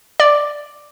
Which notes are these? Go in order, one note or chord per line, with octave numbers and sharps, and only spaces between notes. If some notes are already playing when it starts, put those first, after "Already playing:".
D5